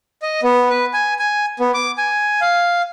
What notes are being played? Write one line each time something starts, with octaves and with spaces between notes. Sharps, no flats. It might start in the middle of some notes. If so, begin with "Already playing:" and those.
D#5
B3
B4
G#5
G#5
B3
D6
G#5
F5